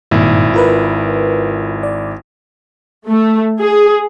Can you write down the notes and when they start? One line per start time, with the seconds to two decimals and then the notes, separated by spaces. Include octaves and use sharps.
0.11 G#1 G2 A#2 D#3 E4
0.54 F4 A#4 B4
1.83 D5
3.07 A3
3.59 G#4